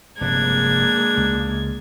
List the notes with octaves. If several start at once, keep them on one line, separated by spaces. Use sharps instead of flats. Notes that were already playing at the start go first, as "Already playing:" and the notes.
F1 G2 G#3 A#3 D4 G#6
C#2